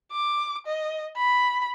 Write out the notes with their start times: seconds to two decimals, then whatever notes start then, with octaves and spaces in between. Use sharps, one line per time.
0.12 D6
0.67 D#5
1.16 B5